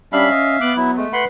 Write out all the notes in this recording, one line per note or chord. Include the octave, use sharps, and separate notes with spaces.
G3 C#4 D4 E5 F5 B5
D#5
B3 D6 F#6
F#3 E4
G#3 A3
B4 F#5 B5 C6